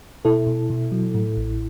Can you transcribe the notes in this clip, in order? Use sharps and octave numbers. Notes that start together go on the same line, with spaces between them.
B2 E4 A4
B2
B2
F#3
A2
A1